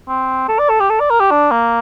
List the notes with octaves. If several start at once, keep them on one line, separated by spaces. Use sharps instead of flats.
C4
A4
D5
A4
G4
A4
D5
A#4
G4
D4
A#3